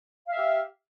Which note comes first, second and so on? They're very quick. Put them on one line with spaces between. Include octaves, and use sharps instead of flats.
F5 E5 G4